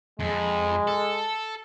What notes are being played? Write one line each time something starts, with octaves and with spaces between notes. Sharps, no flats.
F2 G#3
A4